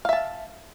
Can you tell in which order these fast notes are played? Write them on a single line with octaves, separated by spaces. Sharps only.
F5 E5 A5